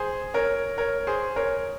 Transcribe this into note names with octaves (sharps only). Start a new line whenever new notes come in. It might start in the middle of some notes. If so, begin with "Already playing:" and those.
Already playing: G#4 C5
A#4 C#5
A#4 C#5
G#4 C5
A#4 C#5